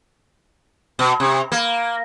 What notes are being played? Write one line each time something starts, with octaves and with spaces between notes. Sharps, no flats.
B2
C3
A#3